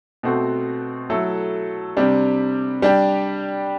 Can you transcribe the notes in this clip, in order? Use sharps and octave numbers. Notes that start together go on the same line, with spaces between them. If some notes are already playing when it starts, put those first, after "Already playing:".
B2 A3 C4 F#4
F#3 A3 E4 A4
C3 G3 D4
G3 D4 G4